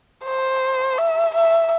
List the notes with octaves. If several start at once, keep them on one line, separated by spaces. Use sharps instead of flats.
C5
E5
E5